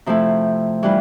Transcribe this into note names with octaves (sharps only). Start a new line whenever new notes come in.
C3 F3 A3 E4
E3 G3 D4 F4